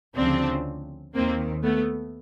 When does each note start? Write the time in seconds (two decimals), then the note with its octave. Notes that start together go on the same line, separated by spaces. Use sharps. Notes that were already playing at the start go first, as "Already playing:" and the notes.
0.16 D2 C#3 F3 C4 D4
1.15 D#2 D#3 A#3 C4
1.63 A3 B3